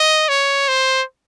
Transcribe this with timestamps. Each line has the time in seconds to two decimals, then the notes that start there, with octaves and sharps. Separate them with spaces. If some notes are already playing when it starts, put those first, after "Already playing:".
Already playing: D#5
0.29 C#5
0.68 C5